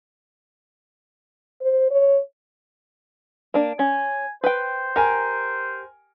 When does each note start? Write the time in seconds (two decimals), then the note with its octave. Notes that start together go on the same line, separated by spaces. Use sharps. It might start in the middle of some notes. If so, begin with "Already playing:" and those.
1.61 C5
1.91 C#5
3.54 A#3 D4
3.79 C#4 G#5
4.44 B4 C5 G5
4.96 G4 A#4 G#5